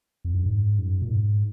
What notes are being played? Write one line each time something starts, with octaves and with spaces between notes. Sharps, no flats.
F2
F#2
G#2
F#2
A#2
G#2